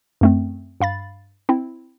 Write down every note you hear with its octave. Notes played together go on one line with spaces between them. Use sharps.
F#2 A3 C4
G2 F5 B5 A6
C4 E4